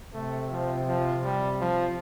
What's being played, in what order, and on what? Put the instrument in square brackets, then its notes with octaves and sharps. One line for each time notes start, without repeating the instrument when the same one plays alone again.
[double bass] C3 [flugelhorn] A3
[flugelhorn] F3
F3
G3
F3